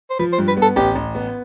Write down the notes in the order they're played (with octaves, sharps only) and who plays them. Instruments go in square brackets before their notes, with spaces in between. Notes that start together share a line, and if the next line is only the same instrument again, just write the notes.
[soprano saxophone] C5
[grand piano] F3 [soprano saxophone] B4
[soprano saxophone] C5
[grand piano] G2
[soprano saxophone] B4
[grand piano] B3
[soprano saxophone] A4
[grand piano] A1 [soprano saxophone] G4
[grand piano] A1
B3